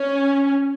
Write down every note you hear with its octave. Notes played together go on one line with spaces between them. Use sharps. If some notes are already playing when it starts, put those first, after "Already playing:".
Already playing: C#4